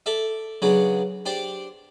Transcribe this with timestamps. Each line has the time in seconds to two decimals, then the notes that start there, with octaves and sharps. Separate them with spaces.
0.06 A4 D5 E5
0.62 C#3 F#3 B3 D4
1.26 D4 G4 C5 D5